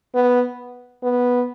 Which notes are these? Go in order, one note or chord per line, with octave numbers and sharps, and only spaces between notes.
B3
B3